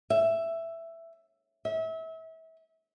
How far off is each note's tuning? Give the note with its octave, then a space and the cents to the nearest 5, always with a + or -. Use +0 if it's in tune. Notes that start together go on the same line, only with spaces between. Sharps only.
E5 +10
E5 -30